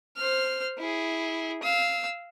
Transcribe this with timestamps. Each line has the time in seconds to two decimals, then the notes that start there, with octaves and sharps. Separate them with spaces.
0.16 C5 F6
0.78 E4 G#4
1.63 F5 E6